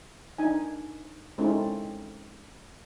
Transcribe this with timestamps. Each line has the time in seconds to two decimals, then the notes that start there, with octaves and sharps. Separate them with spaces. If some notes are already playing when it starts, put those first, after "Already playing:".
0.38 D4 D#4 G#5
1.38 G#3 C4 C#4 D#4 E4 A4